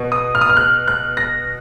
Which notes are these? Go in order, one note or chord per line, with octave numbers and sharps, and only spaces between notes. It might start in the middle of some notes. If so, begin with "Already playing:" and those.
Already playing: B2
D#6
F6
D#6
F6
F#6
F#6
A#6